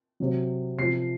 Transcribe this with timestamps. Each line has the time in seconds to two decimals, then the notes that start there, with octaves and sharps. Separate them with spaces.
0.20 C3 F#3
0.78 C3 F3 C7